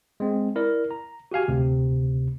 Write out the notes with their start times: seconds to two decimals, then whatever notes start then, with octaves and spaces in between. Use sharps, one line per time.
0.20 G#3 C4
0.56 E4 A#4 D5
0.91 A#5
1.32 F#4 G4 F5 G#5
1.48 D2 C3